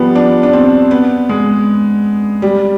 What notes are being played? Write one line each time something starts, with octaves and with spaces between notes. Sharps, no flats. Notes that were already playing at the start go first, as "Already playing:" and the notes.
Already playing: F3 G3 B3
D4
D4
C4
B3
G#3
G3